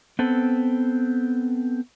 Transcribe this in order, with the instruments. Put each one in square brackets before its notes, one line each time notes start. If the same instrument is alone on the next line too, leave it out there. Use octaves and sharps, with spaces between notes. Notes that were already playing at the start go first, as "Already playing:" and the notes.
[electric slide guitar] B3 C4 A4